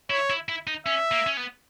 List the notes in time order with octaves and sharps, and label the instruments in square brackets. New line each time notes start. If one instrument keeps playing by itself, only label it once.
[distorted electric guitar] E4 [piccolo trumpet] C#5
[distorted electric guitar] E4
E4
D#4
[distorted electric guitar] C#4 [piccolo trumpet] E5
[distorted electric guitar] A#3
C#4
B3